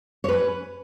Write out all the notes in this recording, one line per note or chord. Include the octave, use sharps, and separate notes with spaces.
C#4 B4 C#5